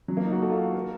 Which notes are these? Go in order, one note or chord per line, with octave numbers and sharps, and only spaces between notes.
F#3
A#3
D#4
F#4
A4
F4
F#4
A#4